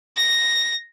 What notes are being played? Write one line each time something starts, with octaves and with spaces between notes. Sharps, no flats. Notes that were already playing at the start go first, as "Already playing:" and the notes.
A#6